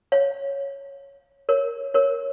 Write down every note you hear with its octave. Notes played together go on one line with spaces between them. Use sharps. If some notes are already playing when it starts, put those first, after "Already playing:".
C#5 F5
A#4 C#5
A#4 C#5